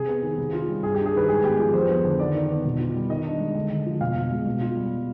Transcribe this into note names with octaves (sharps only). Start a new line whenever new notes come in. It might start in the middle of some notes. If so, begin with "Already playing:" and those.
Already playing: C3 G#4
B3
D#3
C3
F4
G3
G2 G#4
G4
D4
G#4
D#3 B4
G#2 G#4
B3 G4
F3 G#4
F2 C5
B3
D3
D#3 D5
D#3
B3
B2
F4
G3
D#3 D#5
D4
G#3
D3
D3
F3
B2 F5
B2
G#3
B2
F4
G3